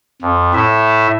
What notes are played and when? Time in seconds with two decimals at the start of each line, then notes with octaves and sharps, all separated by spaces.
0.22 F2
0.54 A2 E5